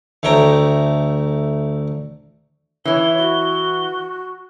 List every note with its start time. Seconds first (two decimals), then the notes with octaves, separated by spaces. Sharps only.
0.23 D2 A3 C#5 G5 A#5
2.85 E3 E4 C#5 G7
3.18 F#4